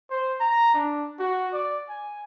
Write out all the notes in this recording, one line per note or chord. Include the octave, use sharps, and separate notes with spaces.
C5
A#5
D4
F#4
D5
G#5